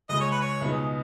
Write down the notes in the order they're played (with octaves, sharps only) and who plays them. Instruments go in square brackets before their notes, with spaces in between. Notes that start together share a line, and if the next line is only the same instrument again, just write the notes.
[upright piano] C#2 C#3 G#3 [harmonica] D#5
[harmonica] C#5
B4
C#5
[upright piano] C#2 B2 B3 D#4 G#4